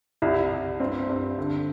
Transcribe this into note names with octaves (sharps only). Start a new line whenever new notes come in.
C2 E4
C2
G2 C4
G2
D3